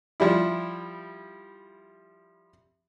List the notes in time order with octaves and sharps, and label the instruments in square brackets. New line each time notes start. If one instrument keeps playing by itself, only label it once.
[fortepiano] F3 G3 E4